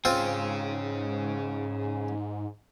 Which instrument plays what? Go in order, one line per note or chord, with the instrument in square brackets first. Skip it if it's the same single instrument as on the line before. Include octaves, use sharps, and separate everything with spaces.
[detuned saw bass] G#2 [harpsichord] C4 F4 [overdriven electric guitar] C#4 G#4